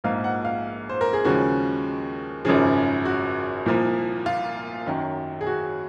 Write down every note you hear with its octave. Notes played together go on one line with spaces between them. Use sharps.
A#1 G#2 F3 A#3 F5
F#5
F5
C5
A#4
G#4
D#2 C#3 F3 G#3 F#4
G#1 F#2 C#3 F3 G#4
F#4
C2 A#2 F3 A#3
F4
F#2 D#3 F#3
G#4
F#4